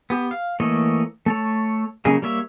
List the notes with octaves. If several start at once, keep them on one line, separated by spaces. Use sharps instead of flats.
B3 G4
F5
E3 A3 A#3 C#5 D#5
A3 A4 C#5
C#3 F#3 A#3 D#4 G#4
G3 A#3 C#5 E5